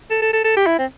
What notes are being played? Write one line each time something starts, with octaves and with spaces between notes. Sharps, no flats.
A4
A4
A4
A4
G4
E4
C4